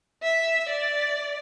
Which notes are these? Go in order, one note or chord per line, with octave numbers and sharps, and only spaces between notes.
E5
D5